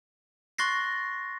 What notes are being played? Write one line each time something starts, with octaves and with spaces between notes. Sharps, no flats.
C6 C#6 F#6 A6 A#6 C7